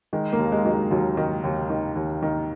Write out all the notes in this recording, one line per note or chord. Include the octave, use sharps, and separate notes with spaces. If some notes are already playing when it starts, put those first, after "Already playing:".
D#3 G#3
A#3
D#2
G#3
D#3 F#3
G#3
D#2 F#3
D#3
D#2
D#3
D#2
D#3